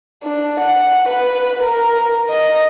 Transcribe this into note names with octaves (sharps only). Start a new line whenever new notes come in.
D4
F#5
B4
A#4
D#5